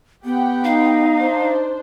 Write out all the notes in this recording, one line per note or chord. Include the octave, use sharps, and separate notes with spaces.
B3 G4 F#5 G5
D#4 F5
D4 C5